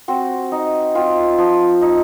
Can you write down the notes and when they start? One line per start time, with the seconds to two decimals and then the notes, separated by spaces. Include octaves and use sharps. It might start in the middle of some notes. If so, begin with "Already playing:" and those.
0.08 C4 F#4
0.52 D#4
0.95 C4 F4
1.38 F3
1.81 D#4